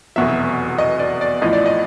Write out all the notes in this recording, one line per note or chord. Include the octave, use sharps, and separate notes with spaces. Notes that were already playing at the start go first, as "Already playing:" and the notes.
F1 E2 B2 F#3 E5
D#5
D5
D5
A1 A2 F3 D#5
D5
D#5